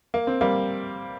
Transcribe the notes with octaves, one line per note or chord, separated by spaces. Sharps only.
A#3
C4
G3 A#3